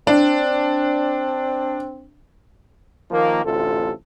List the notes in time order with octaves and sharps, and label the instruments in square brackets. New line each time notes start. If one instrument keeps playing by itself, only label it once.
[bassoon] C4 [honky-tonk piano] D4
[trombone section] D#3 F3 A#3
A1 D2 C3 F4 A4